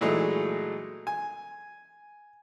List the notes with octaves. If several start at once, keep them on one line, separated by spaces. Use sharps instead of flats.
A#2 E3 F#3 G#3 A3 D#4
G#5